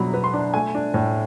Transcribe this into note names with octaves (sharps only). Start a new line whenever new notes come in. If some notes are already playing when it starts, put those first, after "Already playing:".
Already playing: B2 F#3 D4 A#5 B5
B3
C6
D4
A3 G#5
D4
A2